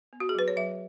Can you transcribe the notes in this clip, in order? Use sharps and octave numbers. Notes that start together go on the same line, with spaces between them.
B3
F#4
G#4
F#3 B4
C#5
F#3 E5